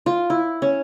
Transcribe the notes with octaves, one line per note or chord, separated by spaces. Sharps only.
F4
E4
C#4